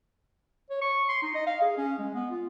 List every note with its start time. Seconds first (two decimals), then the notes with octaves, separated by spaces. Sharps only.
0.70 C#5
0.82 C#6
1.09 C6
1.23 D#4
1.35 D#5
1.47 F5
1.62 G#4
1.78 C#4
1.99 G#3
2.15 B3
2.31 F4